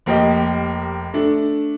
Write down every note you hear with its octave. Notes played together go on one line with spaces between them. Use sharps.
F1 A#3 G4 D#5
A3 D4